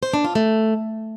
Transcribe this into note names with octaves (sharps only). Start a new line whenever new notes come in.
C5
D4
F4
A3